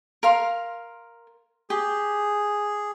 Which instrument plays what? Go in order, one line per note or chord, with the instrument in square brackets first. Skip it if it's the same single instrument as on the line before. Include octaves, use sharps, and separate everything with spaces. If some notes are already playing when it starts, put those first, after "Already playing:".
[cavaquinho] A#4 F5 C6
[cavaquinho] G4 [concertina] G#4